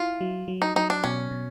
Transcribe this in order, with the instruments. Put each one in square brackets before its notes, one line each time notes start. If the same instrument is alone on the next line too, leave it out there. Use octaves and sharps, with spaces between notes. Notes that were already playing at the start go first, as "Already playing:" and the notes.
Already playing: [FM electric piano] E4 [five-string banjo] F4
[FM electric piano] F#3
F#3
[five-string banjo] D#4
[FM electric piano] F#3 [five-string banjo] D#4
[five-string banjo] D4
[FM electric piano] B2 [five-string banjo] C#4
[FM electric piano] B2